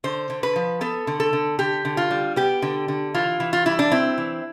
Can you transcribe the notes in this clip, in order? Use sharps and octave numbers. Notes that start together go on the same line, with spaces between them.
D3 C5
D3
B4
F3
B3 A4
D3
A4
D3
D3 G4
D3
F4
G3
B3 G4
D3
D3
E3 F4
E3
F4
G3 E4
D4
C4 E4
E3